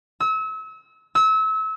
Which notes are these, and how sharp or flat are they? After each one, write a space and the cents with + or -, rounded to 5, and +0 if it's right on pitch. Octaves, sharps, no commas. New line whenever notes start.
E6 -35
E6 -30